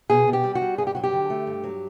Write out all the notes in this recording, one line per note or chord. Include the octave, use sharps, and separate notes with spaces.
B2 G#4
B2
G4
G3
F#4
G3
G2 G#4
G4
F#3 F#4
G4
D3
A3
G2
F#3